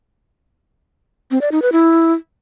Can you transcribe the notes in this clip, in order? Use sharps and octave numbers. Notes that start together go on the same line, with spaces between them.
C4
D5
D#4
B4
E4